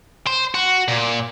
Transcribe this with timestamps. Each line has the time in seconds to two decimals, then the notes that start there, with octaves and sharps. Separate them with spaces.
0.27 C5
0.55 F#4
0.88 A#2